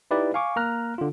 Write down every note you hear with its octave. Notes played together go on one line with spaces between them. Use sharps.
D#4 E4 G4 B4 D5
F5 G#5 C#6 D6
A#3 A#5 F6 F#6
D3 F4